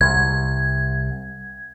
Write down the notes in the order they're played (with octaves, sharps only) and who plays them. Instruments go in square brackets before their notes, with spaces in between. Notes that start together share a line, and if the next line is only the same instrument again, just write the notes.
[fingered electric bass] C2 [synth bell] G#6